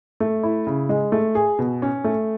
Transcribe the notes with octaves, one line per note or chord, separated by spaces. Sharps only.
A3
E4
C#3
G#3
A3
G#4
B2
C#4
A3